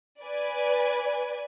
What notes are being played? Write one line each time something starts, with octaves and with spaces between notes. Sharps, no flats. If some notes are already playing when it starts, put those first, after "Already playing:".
B4 D5 G#5